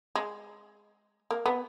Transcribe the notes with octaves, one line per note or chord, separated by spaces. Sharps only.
G#3
A#3
B3